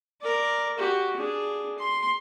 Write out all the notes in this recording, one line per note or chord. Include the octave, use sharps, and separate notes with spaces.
A#4 D5
F#4 G4
D4 G#4
C6